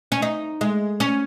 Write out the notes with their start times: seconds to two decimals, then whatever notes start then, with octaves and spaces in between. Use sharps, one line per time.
0.12 C#4
0.22 D#4
0.61 G#3
1.00 C#4